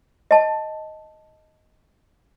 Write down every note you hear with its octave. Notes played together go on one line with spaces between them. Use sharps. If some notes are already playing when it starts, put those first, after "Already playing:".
D#5 A5